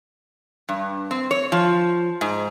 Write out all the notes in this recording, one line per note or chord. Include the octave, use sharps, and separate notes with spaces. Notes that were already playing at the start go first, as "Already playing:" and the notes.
G2
C4
C#5
F3
G#2